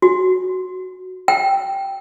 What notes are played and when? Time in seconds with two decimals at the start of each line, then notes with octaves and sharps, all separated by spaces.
0.02 F#4
1.28 G5